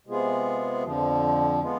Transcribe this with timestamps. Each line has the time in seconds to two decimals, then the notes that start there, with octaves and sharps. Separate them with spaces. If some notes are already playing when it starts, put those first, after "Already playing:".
0.07 C3 G#3 B3 F4 G#4
0.83 F2 D3 F3
1.61 G#3 B3 F4